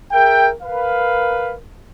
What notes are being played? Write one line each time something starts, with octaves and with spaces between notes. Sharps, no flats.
G#4 A#4 E5 G5
A#4 B4 F5